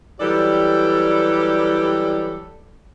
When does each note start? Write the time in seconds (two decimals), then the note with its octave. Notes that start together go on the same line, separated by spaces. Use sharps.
0.20 E3 F#3 G3 G4 A4 D5